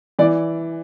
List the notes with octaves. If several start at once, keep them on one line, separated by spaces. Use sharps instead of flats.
E3 D5